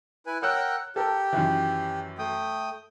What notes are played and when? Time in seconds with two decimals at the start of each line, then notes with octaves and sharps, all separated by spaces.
0.27 E4 B4 G#5
0.42 A#4 C#5 F#5 G5 E6 F#6
0.96 G4 A4 A#4 A5
1.33 F#2 D#3 E3
2.19 A3 G5 D#6